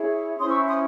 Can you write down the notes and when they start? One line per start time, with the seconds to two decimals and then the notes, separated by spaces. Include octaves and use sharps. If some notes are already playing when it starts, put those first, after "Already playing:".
Already playing: E4 G#4 C#5
0.39 C#4 E4 C5 C6 D#6
0.48 C#6 E6
0.66 C6 D#6